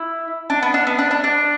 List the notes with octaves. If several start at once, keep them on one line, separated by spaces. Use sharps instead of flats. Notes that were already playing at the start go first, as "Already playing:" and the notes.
Already playing: E4
D4
B3
D4
B3
D4
D4
D4